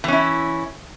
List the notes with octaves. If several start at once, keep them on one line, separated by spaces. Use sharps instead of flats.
E3 C#4 E4